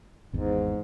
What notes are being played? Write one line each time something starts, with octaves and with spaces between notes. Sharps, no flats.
G#1 E2 G#2